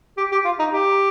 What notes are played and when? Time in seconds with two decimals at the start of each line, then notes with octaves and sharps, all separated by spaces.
0.18 G4
0.32 G4
0.45 F4
0.59 D#4
0.73 G4